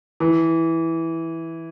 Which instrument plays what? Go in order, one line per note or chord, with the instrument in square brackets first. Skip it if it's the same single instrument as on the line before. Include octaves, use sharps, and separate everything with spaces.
[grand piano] E3